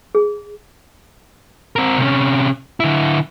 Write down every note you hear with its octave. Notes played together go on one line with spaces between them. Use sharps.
G#4
C4 A#4
C3 C#4
D3 E4